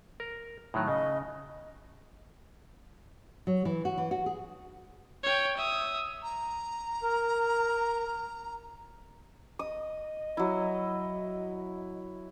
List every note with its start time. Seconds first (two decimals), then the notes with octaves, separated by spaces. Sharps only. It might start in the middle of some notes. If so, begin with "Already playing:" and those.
0.20 A#4
0.74 A2 D#3 F#3
0.88 C#3 D#5
3.47 F#3
3.65 E3
3.85 F#4
3.98 E3
4.11 F#4
4.26 G#4
5.24 C#5 G5
5.58 E5 D#6
6.23 A#5
7.03 A#4
9.59 D#5 D#6
10.37 F#3 E4